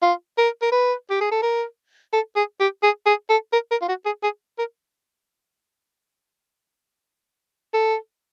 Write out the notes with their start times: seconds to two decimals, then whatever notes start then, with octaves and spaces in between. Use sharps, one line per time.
0.02 F4
0.38 A#4
0.62 A#4
0.72 B4
1.10 G4
1.21 G#4
1.31 A4
1.42 A#4
2.13 A4
2.36 G#4
2.60 G4
2.83 G#4
3.06 G#4
3.30 A4
3.53 A#4
3.71 A#4
3.82 F4
3.88 F#4
4.06 G#4
4.23 G#4
4.58 A#4
7.74 A4